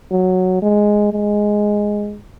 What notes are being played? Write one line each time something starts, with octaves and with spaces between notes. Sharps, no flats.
F#3
G#3
G#3